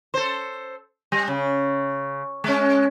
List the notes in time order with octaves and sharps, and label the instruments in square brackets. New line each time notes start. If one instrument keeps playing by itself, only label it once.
[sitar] A4 C5
G3
C#3
G#3 C#4